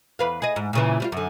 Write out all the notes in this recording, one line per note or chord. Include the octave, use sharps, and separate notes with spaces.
E2 B4 F5
G#4 D#5
G#2
A#2 C#3 E3
G3 C#4 F4
F#2 D3